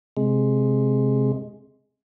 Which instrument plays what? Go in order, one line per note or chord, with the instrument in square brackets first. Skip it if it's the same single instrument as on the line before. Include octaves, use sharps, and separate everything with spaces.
[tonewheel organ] C3 G#3